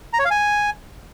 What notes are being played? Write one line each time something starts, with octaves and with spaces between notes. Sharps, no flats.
A#5
C#5
F5
G#5